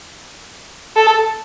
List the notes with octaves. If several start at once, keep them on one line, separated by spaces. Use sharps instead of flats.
A4